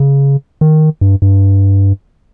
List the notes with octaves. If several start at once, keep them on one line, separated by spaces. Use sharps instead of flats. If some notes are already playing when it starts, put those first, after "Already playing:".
Already playing: C#3
D#3
G2
G2